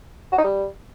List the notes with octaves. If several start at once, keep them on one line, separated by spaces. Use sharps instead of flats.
F#4
D#4
G3